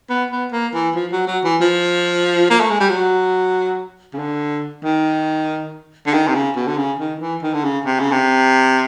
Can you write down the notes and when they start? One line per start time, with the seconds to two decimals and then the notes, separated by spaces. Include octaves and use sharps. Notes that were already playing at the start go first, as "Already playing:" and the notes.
0.09 B3
0.31 B3
0.52 A#3
0.74 E3
0.95 F3
1.12 F#3
1.27 F#3
1.44 E3
1.61 F3
2.50 A#3
2.60 A3
2.70 G#3
2.80 G3
2.89 F#3
4.13 C#3
4.18 D3
4.84 D#3
6.06 D3
6.13 D#3
6.28 C3
6.35 C#3
6.55 B2
6.67 D3
6.77 C#3
6.99 D#3
7.20 E3
7.43 D#3
7.54 D3
7.64 C#3
7.86 C3
8.00 C#3
8.12 C3